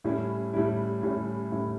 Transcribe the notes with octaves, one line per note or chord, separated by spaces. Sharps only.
A2 G3 C#4 E4
A2 G3 C#4 E4
A2 G3 C#4 E4
A2 G3 C#4 E4